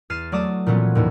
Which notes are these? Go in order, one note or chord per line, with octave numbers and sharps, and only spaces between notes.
E2 F6 A6 C7 D#7 E7
F#3 A3 D5 D6 D#6 E7
A#2 E3 F3 B3 C#4 F#4
D#2 A2 E3